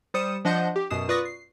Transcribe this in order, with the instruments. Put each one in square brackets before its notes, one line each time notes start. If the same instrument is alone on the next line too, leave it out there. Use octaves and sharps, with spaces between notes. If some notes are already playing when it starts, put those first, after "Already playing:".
[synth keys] G3 C5 D#6 C#7 D#7 E7
F3 D4 D#5 F#5 C6 G6
G4
F#2 B2 D#6 C7 E7
F4 B4 D5 C#6 D#6 A#6
C7